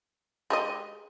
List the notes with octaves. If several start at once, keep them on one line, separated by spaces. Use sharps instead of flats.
G#3 G4 D#5